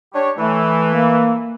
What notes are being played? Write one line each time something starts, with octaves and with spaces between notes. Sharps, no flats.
D4 G4 C#5
E3 A3
A#3